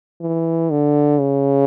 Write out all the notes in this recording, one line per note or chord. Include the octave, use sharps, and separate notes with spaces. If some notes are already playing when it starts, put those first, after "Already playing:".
E3
D3
C#3